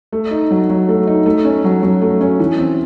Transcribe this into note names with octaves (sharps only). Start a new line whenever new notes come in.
A3
D#4
F#3
F#3
A3
D#4
A3
C#4
F#3
F#3
A3
C#4
E3
C4